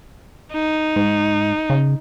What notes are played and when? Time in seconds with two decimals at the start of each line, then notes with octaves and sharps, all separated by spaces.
0.52 D#4
0.96 G#2
1.70 C#3